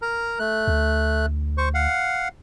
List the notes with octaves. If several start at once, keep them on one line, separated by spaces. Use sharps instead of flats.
A#4 A#5
A3 F#6
D2
C5 C#6
F5 F#5